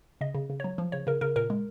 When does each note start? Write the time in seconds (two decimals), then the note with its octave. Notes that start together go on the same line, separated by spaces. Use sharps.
0.21 C#3 D#5
0.35 C#3
0.50 C#3
0.60 F#3 C#5
0.78 F3
0.92 C#3 C#5
1.07 C#3 A#4
1.21 C#3 A#4
1.36 A#2 A#4
1.50 G#3